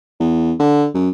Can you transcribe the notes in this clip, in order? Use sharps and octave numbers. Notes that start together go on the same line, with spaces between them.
E2
D3
F#2